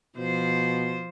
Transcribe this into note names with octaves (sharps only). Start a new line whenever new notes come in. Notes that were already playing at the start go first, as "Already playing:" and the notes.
B2 F3 C5